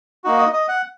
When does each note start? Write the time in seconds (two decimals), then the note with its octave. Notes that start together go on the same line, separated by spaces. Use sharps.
0.24 A#3 D#4 F#4
0.38 D#5
0.53 D#5
0.68 F#5